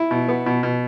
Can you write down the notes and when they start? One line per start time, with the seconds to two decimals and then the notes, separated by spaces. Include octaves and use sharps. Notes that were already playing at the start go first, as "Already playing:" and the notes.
Already playing: E4
0.11 B2
0.28 B3
0.46 B2
0.63 B2